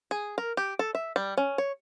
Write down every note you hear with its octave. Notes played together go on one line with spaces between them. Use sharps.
G#4
A#4
G4
A4
E5
G3
C#4
C#5